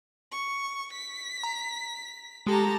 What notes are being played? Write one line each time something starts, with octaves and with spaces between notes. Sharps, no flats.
C#6
B6
A#5
G#3 G4 A4 A5 A#5